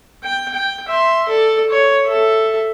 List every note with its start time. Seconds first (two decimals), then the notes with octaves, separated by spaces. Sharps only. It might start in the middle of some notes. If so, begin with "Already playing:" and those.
0.24 G5
0.54 G5
0.88 E5 C6
1.29 A4 D5
1.70 C#5
2.06 A4 E5